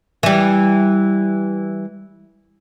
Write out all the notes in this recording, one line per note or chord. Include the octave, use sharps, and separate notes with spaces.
E3 G3